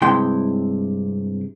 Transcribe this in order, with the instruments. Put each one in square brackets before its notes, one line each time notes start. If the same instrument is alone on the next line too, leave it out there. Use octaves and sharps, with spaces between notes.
[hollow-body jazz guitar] G2 C3 G#3 E4 G5 C6